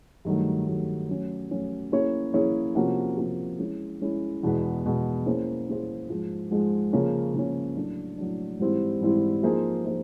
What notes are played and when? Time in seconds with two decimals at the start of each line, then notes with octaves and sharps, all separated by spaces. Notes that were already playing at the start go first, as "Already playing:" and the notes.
0.25 G2 D#3 F#3 A3
0.67 G2 D#3 F#3 A3
1.09 F#3 A3 C#4
1.51 F#3 A3 C#4
1.92 A#3 C#4 E4 G#4 C#5
2.34 A#3 C#4 E4 G#4 C#5
2.75 C3 F3 A#3 C#4 F#4
3.17 C3 F3 A#3 C#4 F#4
3.59 G#3 C#4 E4
4.01 G#3 C#4 E4
4.43 E2 B2 G#3 B3
4.84 E2 B2 G#3 B3
5.26 A#3 C#4 E4 G#4 C5
5.68 A#3 C#4 E4 G#4 C5
6.09 G#2 F3 G#3
6.51 G#2 F3 G#3
6.93 C#3 F3 A#3 C#4
7.34 C#3 F3 A#3 C#4
7.76 A2 F#3 A3 D4
8.18 A2 F#3 A3 D4
8.59 G#2 E3 G3 C4 E4
9.01 G#2 E3 G3 C4 E4
9.43 F3 A#3 D#4 G#4 C5
9.85 F3 A#3 D#4 G#4 C5